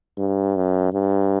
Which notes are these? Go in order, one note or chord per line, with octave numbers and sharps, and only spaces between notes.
G2
F#2
G2